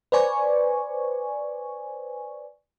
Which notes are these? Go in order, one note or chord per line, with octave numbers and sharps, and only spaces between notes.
B4 C5 D5 G#5 C#6